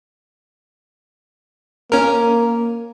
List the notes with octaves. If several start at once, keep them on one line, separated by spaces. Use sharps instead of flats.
A#3 C#4 A#4